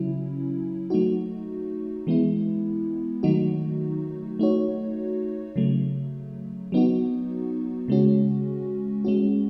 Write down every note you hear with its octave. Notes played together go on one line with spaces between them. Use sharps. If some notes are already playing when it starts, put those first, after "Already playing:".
Already playing: C#3 F#3 C#4 E4
F#3 A3 D#4 F#4
E3 G#3 B3 E4
D#3 F#3 A3 D#4 F#4
A3 D#4 F#4 C#5
C#3 F#3 A3
F#3 B3 D#4 F#4
C#3 G#3 C#4 F#4
G#3 C#4 F#4